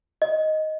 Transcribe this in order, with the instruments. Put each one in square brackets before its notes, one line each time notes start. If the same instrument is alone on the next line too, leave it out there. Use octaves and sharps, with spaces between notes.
[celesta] D#5